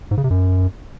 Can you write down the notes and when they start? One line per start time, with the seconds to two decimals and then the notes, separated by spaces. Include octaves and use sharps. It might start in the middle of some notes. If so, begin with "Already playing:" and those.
0.11 G#2
0.18 C#3
0.24 C3
0.31 F#2